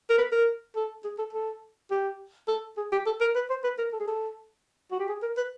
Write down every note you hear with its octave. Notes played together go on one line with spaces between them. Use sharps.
A#4
B4
A#4
A4
G#4
A4
A4
G4
A4
G#4
G4
A4
A#4
B4
C5
B4
A#4
A4
G#4
A4
F#4
G4
G#4
A#4
B4